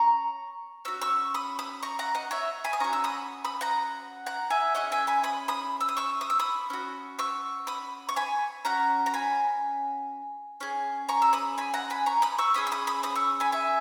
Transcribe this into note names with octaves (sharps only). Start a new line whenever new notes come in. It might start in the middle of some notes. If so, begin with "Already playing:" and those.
Already playing: C#4 A#5 C#6
C#4 F#4 E6
C#6 E6
B5 D#6
B5 D#6
A#5 C#6
F#5 A#5
D#5 F#5
C#5 E5
G#5 B5
D#6
C#4 F#4 A#5 C#6
E6
B5 D#6
B5 D#6
F#5 A#5
F#5 A#5
E5 G#5
C#4 E4 G#4 D#5 F#5
E5 G#5
G#5 B5
B5 D#6
B5 D#6
E6
D#6
C#6 E6
D#6
E6
B5 D#6
C#4 F#4
C#6 E6
B5 D#6
C#6
G#5 B5
C#4 F#4 F#5 A#5
A#5
G#5 B5
C#4 G#4
A#5 C#6
E6
B5 D#6
G#5 B5
F#5 A#5
G#5 B5
A#5 C#6
B5 D#6
C#6 E6
C#4 G#4 B5 D#6
E6
B5 D#6
B5 D#6
B5 D#6
C#6 E6
G#5 B5
E5 G#5